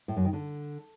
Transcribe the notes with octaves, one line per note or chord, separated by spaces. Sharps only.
A2
F#2
D#3
D3